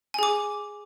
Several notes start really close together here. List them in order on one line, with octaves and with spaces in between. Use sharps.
G#5 G#4 D6